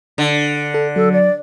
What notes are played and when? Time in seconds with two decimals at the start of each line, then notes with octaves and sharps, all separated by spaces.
0.18 D3
0.74 A4
0.96 F#3 A4
1.12 D5